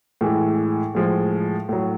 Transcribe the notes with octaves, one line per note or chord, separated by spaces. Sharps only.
A2 E3 G#3
A2 F3 G#3
A2 F#3